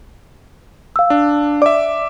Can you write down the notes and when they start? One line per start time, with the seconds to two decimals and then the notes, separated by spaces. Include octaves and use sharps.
0.96 F5 E6
1.10 D4
1.62 D5 E5 D6